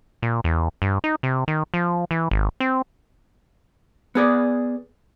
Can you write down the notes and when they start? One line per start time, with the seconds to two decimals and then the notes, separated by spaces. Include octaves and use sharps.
0.22 A#2
0.44 E2
0.82 G2
1.04 D#4
1.23 C3
1.48 D#3
1.74 F3
2.11 E3
2.31 G#1
2.60 C4
4.15 B3 G#4 D5